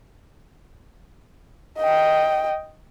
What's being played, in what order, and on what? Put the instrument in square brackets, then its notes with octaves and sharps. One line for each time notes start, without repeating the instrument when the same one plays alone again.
[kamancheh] D#5 G5